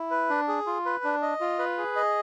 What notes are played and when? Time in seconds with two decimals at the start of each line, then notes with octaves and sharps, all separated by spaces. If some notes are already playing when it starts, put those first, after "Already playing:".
Already playing: E4
0.11 B4
0.30 D4
0.48 G#4
0.66 F4
0.85 B4
1.04 D4
1.22 D#5
1.41 F4
1.59 B4
1.78 G#4
1.96 D#5